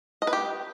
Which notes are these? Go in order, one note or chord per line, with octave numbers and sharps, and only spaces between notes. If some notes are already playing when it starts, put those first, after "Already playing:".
D#5
B4
G4